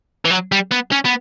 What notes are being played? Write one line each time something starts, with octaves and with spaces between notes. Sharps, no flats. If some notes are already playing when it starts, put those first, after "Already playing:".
E3
F#3
G3
B3
C#4
B3